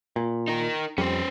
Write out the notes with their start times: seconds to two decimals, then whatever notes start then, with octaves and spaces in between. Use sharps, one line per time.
0.16 A#2
0.48 D#4 A#4
0.98 F2 G3 C#4 C5